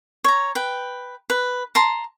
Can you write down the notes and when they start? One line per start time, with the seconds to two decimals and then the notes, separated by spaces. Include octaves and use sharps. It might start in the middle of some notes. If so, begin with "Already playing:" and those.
0.24 C#5 A#5
0.55 B4 G5
1.30 B4
1.75 A5 A#5 C6